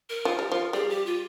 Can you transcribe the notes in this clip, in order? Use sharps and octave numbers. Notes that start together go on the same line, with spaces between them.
A#4
F3
G3
F3
G3 G#4
G4
F4